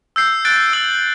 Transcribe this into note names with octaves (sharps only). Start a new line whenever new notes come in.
E6 G6 C7
F#6 A6 D7
E6 A6 D7 F#7